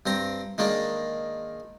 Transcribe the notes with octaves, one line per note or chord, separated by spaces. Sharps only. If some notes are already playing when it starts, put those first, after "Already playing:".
G2 C4 A#5
D#3 G#3 A#3 D4